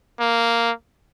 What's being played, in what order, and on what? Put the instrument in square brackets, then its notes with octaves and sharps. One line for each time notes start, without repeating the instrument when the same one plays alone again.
[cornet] A#3